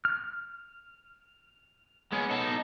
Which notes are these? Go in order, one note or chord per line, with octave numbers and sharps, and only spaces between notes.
F6
G#3 B3 C#4
D#4 A4